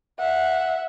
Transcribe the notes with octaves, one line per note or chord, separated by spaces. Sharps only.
E5 F#5